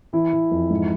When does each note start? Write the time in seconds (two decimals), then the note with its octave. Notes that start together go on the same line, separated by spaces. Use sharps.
0.13 E3 E4
0.33 E3
0.51 F2
0.70 G#2